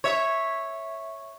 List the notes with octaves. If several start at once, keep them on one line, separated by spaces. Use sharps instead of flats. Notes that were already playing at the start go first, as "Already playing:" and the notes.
C#5 E5